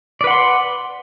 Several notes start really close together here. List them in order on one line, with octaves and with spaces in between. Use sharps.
D5 B4 F#5 C6